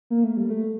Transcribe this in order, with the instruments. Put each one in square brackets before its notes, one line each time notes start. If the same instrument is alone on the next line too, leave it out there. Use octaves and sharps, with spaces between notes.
[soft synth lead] A#3
A3
G3
A3